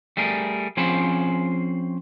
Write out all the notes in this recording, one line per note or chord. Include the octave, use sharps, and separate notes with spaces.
G3 A3 G#4 A#4
F3 C4 C#4 G#4 C5 B5